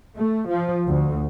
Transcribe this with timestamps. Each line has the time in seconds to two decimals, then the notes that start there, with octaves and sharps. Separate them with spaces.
0.17 A3
0.48 F3
0.87 D2